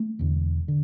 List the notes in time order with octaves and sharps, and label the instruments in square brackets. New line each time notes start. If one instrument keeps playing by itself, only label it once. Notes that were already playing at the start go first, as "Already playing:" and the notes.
Already playing: [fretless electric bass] A3
E1 E2 D3
D3